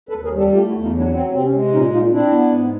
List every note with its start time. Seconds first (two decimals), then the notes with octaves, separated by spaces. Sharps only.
0.09 A4 B4
0.13 D#2
0.24 G#4 A#4
0.33 G3
0.38 G4 A4
0.53 A3 F4 G4
0.68 E4 F#4
0.73 E2
0.82 D#4 F4
0.94 F#3 D4 E4
1.13 C4
1.32 C3 C4
1.43 C#4
1.52 G#3
1.72 A#2 C#4 D#4
1.92 A#2 D#4 F4
2.11 C4 D4 E4
2.32 B3
2.52 G#2